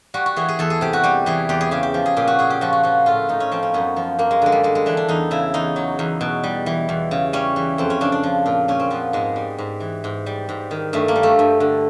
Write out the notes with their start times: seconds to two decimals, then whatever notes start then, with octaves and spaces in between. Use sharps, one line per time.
0.14 G3 F#4
0.26 F#4
0.36 E3 G#4
0.49 G#4
0.59 E2 A4
0.70 G#4
0.81 C3 G4
0.93 F#4
1.04 G3 G4
1.26 E3 G#4
1.49 E2 G4
1.61 G#4
1.71 C#3 G4
1.83 G4
1.94 F3
2.06 G#4
2.17 A#2 G4
2.27 F#4
2.39 A#2 G#4
2.50 G4
2.61 F3 F#4
2.73 F#4
2.83 F3 F#4
3.06 A2 F4
3.29 A2 D#4
3.40 C#4
3.52 F3 C4
3.63 C#4
3.74 F#2 B3
3.96 F3
4.19 F#2 A#3
4.31 G#3
4.42 D3 G#3
4.52 G3
4.63 G3 G#3
4.75 G#3
4.86 E3 D4
4.97 D4
5.08 E2 D#4
5.31 C#3 E4
5.54 E2 D#4
5.76 F#3
5.99 E2
6.21 B2
6.44 G3
6.66 E3
6.89 E2
7.11 C#3
7.33 G3 C#4
7.56 E3
7.78 F2 C4
7.90 C#4
8.01 C#3 D4
8.12 D4
8.23 F3
8.46 A#2
8.68 A#2 C#4
8.80 C4
8.90 F3 B3
9.13 G#2 G#3
9.36 G3
9.58 G#2
9.80 E3
10.04 G#2
10.26 G3
10.49 G#2
10.71 D#3
10.93 G2 A3
11.08 A#3
11.16 G3
11.23 A3
11.39 G2
11.60 D3